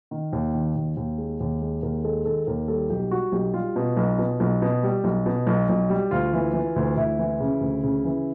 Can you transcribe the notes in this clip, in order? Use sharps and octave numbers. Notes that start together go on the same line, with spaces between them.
D#3
D#2
D#3
D#2
D#2
G#3
D#2
G#3
D#2 A#4
G#3 A4
D#3 A4
D#2 A#4
G3 A4
B1 G4
G3 F#4
B1 G4
G3 F4
B2
B1
B2
B1
B2
G3
B1
B2
B1
B1
G3
D2 F4
E3
E3
D2
D2 E4
E3
C#3
D2
C#3
E3